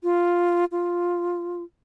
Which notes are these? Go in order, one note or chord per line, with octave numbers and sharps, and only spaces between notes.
F4
F4